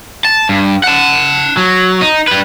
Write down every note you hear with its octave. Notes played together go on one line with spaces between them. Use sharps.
A5
G2
F#5 A5
F#3
D#4
G3 B4